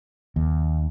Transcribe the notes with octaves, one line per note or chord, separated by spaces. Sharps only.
D#2